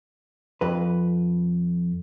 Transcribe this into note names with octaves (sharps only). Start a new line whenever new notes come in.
F2 B4